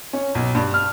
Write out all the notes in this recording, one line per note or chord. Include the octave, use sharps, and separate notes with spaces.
C#4
B1
G2
F6